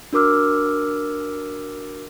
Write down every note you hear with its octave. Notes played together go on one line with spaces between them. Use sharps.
D4 F#4 A#4 D6 E6 F6